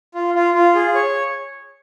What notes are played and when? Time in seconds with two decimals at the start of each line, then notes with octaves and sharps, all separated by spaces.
0.15 F4
0.35 F4
0.54 F4
0.75 G#4
0.95 C#5